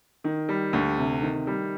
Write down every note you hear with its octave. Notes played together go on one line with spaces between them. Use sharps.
D#3
G3
D2
C3
D#3
G3